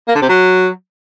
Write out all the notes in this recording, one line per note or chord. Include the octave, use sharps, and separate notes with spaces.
A#3
D3
C3
F#3